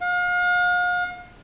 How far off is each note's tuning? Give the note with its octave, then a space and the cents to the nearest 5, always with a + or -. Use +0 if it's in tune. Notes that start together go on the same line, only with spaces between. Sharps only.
F5 +40